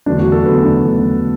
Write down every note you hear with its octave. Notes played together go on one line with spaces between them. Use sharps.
E2 D3 F#3 A3 D4
F#4
A4
E2 D3 F#3 A3 B3
D4
E2 D3 F#3 A3